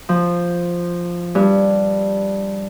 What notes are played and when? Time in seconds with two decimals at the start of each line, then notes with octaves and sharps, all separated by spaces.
0.09 F3
1.35 G2